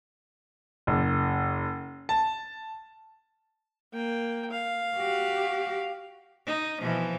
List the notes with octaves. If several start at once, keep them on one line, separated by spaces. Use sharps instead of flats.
F#1
A5
A#3 G5
F5
F#4 G4
D#4
B2 E3 F3